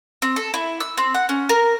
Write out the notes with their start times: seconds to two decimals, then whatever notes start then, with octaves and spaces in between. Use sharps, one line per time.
0.22 C4
0.36 A4
0.54 E4
0.80 E6
0.98 C4
1.14 F#5
1.29 C#4
1.49 A#4